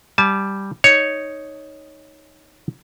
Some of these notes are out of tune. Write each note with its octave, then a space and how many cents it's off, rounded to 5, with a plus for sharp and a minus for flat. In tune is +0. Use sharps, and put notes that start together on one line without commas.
G3 +0 A5 -30
D#4 +0 C#5 +0